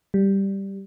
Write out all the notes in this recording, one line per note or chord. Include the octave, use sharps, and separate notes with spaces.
G3